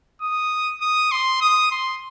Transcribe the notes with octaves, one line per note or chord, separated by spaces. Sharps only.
D#6
D#6
C6
D#6
C6